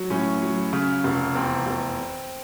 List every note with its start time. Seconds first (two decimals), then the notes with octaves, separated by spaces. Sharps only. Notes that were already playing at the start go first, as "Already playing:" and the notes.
Already playing: F#3
0.10 A2 C#4
0.42 F#3
0.73 C#3
1.04 F1
1.35 E2 C4
1.67 F1